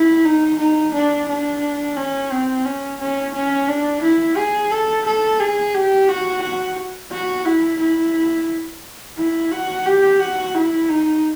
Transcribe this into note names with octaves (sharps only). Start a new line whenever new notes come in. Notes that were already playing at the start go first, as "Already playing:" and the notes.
Already playing: E4
D#4
D#4
D4
D4
C#4
C4
C#4
C#4
C#4
D4
E4
G#4
A4
A4
G#4
G4
F#4
F#4
F#4
E4
E4
E4
F#4
G4
F#4
E4
D#4